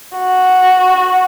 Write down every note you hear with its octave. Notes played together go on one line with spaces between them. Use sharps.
F#4